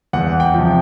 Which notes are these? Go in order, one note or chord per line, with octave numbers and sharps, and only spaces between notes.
E2 F#5
G5
C3 F3